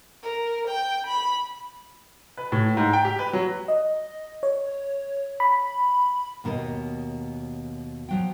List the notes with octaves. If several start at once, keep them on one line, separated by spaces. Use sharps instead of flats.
A#4
G5
B5
B4
A2
G#2
G5
G4
B4
F#3
D#5
C#5
B5
D#2 B2 A#4 C#5 D#5
F3 F#3 G5